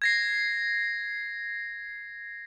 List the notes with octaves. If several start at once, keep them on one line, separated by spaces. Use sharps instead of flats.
G#6 A#6 C7